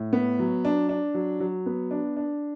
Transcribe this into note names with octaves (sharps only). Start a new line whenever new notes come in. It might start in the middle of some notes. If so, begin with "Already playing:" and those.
Already playing: A2
B3
F#3
D4
D4
F#3
F#3
B3
D4
D4